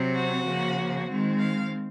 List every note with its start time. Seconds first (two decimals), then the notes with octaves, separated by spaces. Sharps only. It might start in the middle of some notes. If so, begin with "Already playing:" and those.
Already playing: C3 F#3 C4
0.14 F#4
0.46 C#3 F3 A#3
1.08 D#3 G#3 C4
1.39 F5